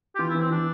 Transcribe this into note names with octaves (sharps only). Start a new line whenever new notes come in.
G4
E3 F4
E4
E3
C4
E3 D4